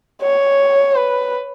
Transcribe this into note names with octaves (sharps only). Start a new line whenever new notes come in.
C#5
B4